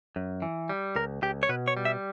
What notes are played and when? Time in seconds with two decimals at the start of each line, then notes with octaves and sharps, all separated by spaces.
0.16 F#2
0.42 E3
0.69 G3
0.96 C#2 A#4
1.23 C#2 G4
1.43 C#5
1.49 B2 B4
1.68 C#5
1.77 G3
1.85 E5